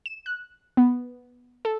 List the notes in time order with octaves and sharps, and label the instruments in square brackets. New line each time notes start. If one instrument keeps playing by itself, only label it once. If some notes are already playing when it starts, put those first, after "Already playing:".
[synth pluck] E7
F#6
B3
A4